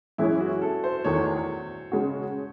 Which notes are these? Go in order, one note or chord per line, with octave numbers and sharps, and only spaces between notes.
F#2 E3 G#3 C#4 E4 G#4
F#4
A4
C5
E2 D#3 A3 C#5
C#3 G#3 C#4 F#4